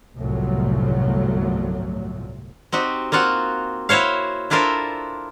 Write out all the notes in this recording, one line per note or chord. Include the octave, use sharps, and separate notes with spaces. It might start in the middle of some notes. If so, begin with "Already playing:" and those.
G1 C2 A2 F3 F#3 A3
C4 D#4 F#4 G4
A#3 C4 F4 F#4 F#5
E4 F#4 C5 C#5 F5
D4 E4 F4 A4 A#4 C5